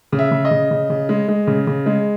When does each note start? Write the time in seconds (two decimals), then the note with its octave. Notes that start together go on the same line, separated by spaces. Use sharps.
0.13 C#3
0.19 E5
0.31 C#3
0.45 D#5
0.51 C#3
0.71 C#3
0.90 C#3
1.09 G#3
1.28 G#3
1.47 C#3
1.67 C#3
1.86 G#3